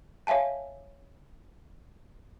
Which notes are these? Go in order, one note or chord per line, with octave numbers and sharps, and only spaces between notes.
C#5 E5 F5 G#5 A5